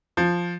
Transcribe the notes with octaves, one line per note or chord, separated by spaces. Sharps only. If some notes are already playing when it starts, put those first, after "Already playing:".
F3